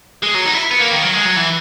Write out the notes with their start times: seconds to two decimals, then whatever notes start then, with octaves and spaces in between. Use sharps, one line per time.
0.23 G#3
0.35 F#3
0.46 D#4
0.54 E4
0.71 B3
0.80 A#3
0.91 D#3
1.03 F#3
1.13 G#3
1.25 F#3
1.36 E3